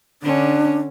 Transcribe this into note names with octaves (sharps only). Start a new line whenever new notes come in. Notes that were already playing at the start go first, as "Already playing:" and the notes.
D3 C#4 D4